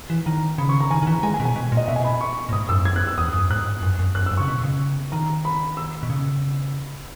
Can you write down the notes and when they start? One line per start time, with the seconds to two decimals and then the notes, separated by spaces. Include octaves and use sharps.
0.10 E3
0.26 D#3 A#5
0.58 C#3 B5
0.69 C#6
0.81 A#5
0.91 D#3 G#5
1.02 D#3
1.07 E3 A#5
1.23 G#3 G#5
1.34 G#5
1.40 B2
1.45 G#5
1.56 B2
1.72 A#2
1.77 D#5
1.88 B2 E5
1.96 G#5
2.04 B5
2.21 C#6
2.49 A#2
2.52 G#2 D#6
2.69 F#2 E6
2.85 G#6
2.96 F#6
3.07 E6
3.18 E2 D#6
3.34 F#2
3.50 G#2 F#6
3.82 F#2
3.99 F#2
4.15 F#2 F#6
4.26 E6
4.32 F#2
4.37 C#3 C#6
4.48 B2
4.64 C#3
5.12 D#3 A#5
5.45 B5
5.77 E6
6.03 B2
6.10 C#3